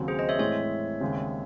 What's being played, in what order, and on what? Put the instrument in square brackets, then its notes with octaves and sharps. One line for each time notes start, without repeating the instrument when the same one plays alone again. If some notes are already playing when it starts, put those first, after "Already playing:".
Already playing: [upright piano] D#2 C#3 F#3 C4
[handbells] G#4 C5
C5 D#5
C#5 E5
[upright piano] A2 E3 G#3 C4 [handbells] C#5 E5
[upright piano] D#2 C#3 G#3 C4